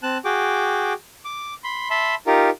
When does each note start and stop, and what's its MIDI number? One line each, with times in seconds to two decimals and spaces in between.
0.03 0.18 60
0.03 0.18 81
0.03 0.18 90
0.25 0.93 66
0.25 0.93 68
0.25 0.93 79
0.25 0.93 86
1.25 1.54 86
1.64 1.89 83
1.64 1.89 84
1.90 2.15 76
1.90 2.15 81
1.90 2.15 83
1.90 2.15 84
2.27 2.50 63
2.27 2.50 65
2.27 2.50 67
2.27 2.50 70